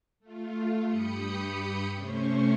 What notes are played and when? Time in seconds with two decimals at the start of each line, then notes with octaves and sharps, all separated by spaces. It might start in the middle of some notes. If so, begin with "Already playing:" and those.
0.20 A3 F4
0.84 G2 G4 B5 D#6 G6 C#7
1.93 C3 A3 C#4 C5 C#6